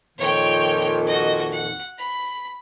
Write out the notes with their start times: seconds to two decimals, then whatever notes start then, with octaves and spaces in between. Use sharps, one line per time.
0.18 F2 A#2 D#3 C#5 G5
1.07 F#4 D#5
1.52 F#5
1.99 B5